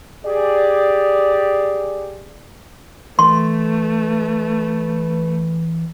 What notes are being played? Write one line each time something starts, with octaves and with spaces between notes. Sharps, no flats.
G4 G#4 D5
E3 A3 B4 C6